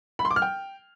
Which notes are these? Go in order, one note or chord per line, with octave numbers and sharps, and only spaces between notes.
B5
C6
D6
F6
G5